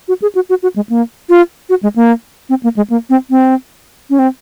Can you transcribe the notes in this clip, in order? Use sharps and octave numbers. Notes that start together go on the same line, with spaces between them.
F#4
G#4
F#4
F#4
F#4
G#3
A#3
F4
F#4
G#3
A#3
C4
A#3
G#3
A#3
C4
C4
C#4
C4